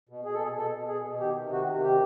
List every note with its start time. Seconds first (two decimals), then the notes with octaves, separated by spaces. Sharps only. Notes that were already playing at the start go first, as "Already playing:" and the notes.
0.09 B2
0.25 B2 G#4
0.34 A4
0.41 B2 G#4
0.56 B2 A4
0.72 B2
0.88 B2 G#4
1.04 B2
1.20 D#3 G4
1.36 C3
1.52 D#3 F#4
1.68 C3
1.83 D#3 G4